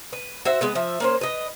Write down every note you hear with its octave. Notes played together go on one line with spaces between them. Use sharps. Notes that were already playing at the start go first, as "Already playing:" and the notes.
B4
F#4 C5 E5
G#3 B3 B4
F3 E5
A#3 C#4 C5
B4 D#5